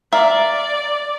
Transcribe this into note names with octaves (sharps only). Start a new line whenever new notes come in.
A#4 D5 E5 F5